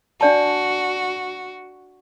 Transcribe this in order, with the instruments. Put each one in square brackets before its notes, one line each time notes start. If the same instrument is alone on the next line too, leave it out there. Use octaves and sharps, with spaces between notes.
[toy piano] D4 D5 A5 [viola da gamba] F#4